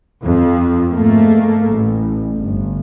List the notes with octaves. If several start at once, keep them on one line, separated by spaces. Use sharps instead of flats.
F2
G#2 A3 A#3
A1
G1